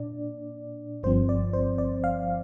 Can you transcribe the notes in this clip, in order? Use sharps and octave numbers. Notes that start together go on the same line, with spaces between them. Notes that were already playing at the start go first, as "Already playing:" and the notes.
Already playing: A#2 D4 D5
G1 G2 F3 C4 C5
D5
C5
D5
F5